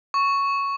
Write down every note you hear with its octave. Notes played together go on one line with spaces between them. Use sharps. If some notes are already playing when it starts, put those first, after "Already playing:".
C#6